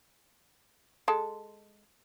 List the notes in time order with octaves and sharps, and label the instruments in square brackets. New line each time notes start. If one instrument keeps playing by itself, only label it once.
[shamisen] G#3 A4